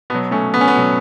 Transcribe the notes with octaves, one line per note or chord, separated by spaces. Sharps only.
B2 F#3 B3
A3 C#4
B3
C#4
B3
B2 F#3